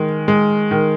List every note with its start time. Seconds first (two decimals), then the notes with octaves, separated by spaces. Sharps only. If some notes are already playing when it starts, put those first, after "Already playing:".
Already playing: D#3 G#3
0.28 G#3
0.71 D#3